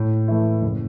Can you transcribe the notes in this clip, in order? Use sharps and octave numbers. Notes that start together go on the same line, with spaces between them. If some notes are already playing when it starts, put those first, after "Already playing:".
Already playing: A2
E3 A3 E4
F#1